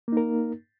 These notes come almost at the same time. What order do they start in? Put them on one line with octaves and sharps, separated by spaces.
A#3 D#4 A#4